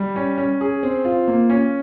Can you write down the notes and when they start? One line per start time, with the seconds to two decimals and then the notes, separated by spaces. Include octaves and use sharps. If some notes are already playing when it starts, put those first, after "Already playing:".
Already playing: G3
0.16 C#4
0.38 C#4
0.61 G#4
0.83 C4
1.05 F4
1.28 A#3
1.50 C#4